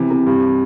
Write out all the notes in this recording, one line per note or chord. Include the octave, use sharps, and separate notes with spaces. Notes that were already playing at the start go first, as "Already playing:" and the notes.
Already playing: C3 E3
C3
G2